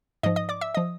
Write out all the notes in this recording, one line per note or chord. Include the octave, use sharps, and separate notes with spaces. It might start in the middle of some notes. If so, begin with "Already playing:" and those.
G#2 F3 D#5 D#6
D#5 D#6
D5 D6
E5 E6
F3 D#5 D#6